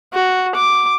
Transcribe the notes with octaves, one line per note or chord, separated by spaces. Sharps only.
F#4
D6